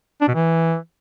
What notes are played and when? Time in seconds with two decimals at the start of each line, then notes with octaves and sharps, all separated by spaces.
0.21 D4
0.28 B2
0.34 E3